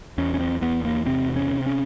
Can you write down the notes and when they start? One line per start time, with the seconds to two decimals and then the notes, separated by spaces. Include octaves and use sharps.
0.18 E2 C#4
0.34 C#4
0.39 C4
0.61 E2 B3
0.85 A#3
1.06 C3 C4
1.36 C#4
1.51 C3
1.66 C#4